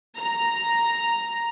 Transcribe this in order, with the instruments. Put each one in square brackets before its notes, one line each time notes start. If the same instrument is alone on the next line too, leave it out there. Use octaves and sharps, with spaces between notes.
[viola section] A#5